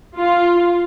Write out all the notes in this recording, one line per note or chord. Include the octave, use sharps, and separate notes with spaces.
F4